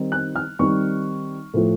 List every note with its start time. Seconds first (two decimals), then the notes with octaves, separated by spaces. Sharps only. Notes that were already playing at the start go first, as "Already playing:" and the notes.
Already playing: D#3 G3 C4 D#4
0.12 F#6
0.36 F6
0.59 D#3 G3 C4 D#4 C#6
1.54 A2 F3 A3